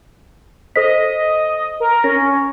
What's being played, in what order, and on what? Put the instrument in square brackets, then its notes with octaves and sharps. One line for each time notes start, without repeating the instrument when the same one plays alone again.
[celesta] A4 C5 B6 [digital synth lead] D#5
[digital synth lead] A#4
[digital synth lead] C#4 [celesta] A#6